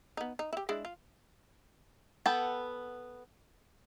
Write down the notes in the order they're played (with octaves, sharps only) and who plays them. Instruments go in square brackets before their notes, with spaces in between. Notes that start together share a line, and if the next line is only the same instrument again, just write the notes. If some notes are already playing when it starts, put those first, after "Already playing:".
[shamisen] B3 D#4
D#4
E4 G4
G#3 D4 E4
F4
[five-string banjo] B3 A4 F#5 G5